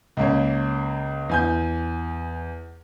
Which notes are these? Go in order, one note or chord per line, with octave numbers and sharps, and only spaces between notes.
C#2 A#3 C#4
E2 G#5 G6